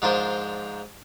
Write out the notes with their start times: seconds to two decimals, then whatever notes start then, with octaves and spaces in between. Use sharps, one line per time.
0.02 G#2 F3 D4 F4 A#4 C5